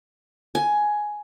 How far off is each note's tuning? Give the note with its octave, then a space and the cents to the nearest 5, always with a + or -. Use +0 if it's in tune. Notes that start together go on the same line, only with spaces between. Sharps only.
G#5 +10